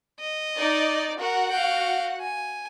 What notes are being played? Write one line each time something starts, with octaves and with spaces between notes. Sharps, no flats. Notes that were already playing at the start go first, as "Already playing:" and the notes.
D#5
D#4 D5
F#4 A#4 F#5
F5 G5
G#5